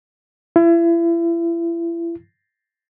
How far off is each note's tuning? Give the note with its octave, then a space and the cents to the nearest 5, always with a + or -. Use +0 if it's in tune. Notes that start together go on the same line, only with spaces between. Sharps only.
E4 +35